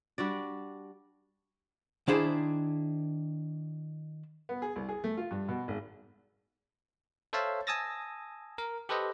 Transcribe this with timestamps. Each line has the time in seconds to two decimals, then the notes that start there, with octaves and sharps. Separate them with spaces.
0.18 G3 D4 F#4 D5
2.08 D#3 D4 E4 G#4 C5
4.49 B3
4.62 G#4
4.76 C2
4.89 G#4
5.04 A3
5.17 F4
5.31 G2
5.48 B2
5.68 G#1
7.33 A4 C5 C#5 E5 F5 A5
7.67 G#5 A5 D#6 E6 A6 A#6
8.58 A#4
8.89 G4 A4 B4 C5 D#5